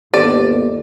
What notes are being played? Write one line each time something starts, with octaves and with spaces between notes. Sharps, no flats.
G1 D#2 G#2 B3 G4 A4 D5